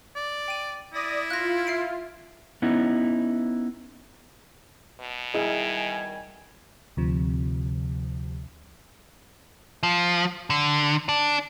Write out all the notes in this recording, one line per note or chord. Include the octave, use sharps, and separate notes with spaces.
D5
G5 D#7
E4 D5 D#6 A#6
F4 F#6 A#6
E5 C7 D7
B3 C#4 D#4 E4
B2
D#3 G3 E4 G#4 D#5 G#5
D2 C3 F3
F3
D3
D4